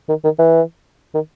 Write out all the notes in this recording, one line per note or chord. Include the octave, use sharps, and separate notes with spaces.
D#3
D#3
E3
D#3